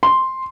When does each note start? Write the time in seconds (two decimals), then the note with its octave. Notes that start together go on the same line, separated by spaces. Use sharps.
0.03 C6